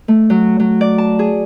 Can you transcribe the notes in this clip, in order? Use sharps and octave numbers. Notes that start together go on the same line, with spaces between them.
A3
F#3
F#3
D5
A5
G#4